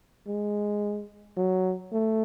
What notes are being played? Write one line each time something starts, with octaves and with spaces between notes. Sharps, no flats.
G#3
F#3
A3